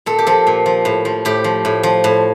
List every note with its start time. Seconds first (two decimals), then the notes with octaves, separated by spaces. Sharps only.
0.06 A#2 A4
0.19 G4
0.27 F3 A4
0.47 A#2
0.66 F3
0.85 A2
1.05 F3
1.25 A2 G4
1.44 F3
1.65 A2
1.83 F3
2.04 A2